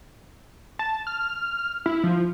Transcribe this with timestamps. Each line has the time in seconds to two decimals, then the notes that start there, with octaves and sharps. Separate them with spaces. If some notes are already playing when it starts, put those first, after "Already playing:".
0.79 A5
1.07 F6
1.86 E4
2.04 F3